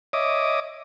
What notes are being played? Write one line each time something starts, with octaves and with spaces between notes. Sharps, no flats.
C#5 D#5 E5 D6 D#6